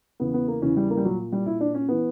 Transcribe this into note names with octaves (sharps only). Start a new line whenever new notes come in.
E2 C#3 E3 B3
B3
A#3
E2 C#3 E3 C#4
G3
A#3
G3
A#2 F#3
G3
A#2 E4
D4
C#4
E3 B3